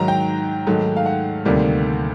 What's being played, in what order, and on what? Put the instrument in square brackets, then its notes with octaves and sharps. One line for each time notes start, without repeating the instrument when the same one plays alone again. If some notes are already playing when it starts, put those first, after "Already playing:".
Already playing: [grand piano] G#2 D#3 F#3 A#5
G5
G#2 D#3 F#3 A3
F5
F#5
D2 C3 D#3 G3 A#3